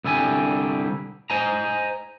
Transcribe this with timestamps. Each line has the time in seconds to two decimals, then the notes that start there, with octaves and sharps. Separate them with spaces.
0.04 C2 D3 G3 G#5
1.30 C5 D#5 G#5 A#5